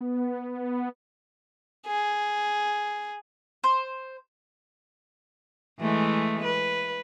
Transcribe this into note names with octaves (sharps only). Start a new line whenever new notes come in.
B3
G#4
C5
E3 G#3 A3
B4